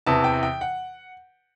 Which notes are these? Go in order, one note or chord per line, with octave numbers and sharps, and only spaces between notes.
E2 C3 E3 A5
G5
G5
F#5